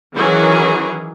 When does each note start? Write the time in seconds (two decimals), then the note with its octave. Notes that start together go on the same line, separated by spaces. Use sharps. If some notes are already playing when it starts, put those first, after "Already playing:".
0.15 D#3 E3 F#3 C#4 G#4 A#4